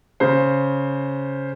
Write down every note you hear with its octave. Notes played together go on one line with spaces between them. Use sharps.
C#3 C5